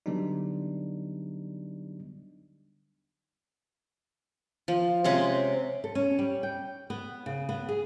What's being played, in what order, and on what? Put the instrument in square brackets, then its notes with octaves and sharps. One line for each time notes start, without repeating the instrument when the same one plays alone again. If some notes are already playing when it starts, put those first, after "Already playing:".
[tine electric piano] D3 F#3 G3 B3 D4 D#4
[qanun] F3
C3 G#3 C#4 F#5
[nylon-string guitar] A4
C#4
G3
G5
B3
C#3
B3
G#4